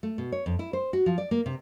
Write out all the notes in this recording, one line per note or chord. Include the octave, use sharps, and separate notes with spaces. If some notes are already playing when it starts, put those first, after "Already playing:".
A3
B2
C#5
F2
E4
C5
F#4
F3
D5
A#3
C3